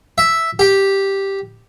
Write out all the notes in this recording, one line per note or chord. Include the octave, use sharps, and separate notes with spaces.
E5
G4